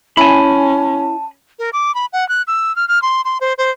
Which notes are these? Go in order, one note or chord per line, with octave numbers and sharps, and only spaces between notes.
C#4 E4 G#5 A5 B5
A#4
D6
B5
F#5
F#6
E6
F6
F6
C6
C6
C5
C5